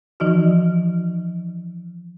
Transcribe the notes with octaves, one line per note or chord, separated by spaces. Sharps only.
E3 F3 D#4 F#4